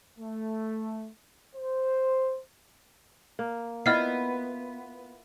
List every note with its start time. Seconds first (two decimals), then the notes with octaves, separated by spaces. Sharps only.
0.19 A3
1.56 C5
3.39 A#3
3.86 B3 E4 F4 D#5 F6 C7